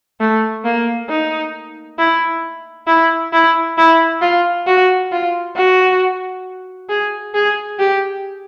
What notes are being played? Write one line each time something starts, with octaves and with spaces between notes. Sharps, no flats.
A3
A#3
D#4
E4
E4
E4
E4
F4
F#4
F4
F#4
G#4
G#4
G4